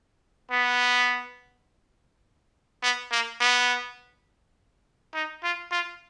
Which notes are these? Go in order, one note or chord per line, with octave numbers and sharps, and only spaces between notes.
B3
B3
A#3
B3
D#4
F4
F4